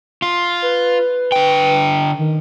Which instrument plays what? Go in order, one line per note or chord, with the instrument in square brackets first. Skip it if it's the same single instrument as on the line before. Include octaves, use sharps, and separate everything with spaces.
[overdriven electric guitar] F4
[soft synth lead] B4
[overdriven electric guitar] D3 G5
[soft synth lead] D#3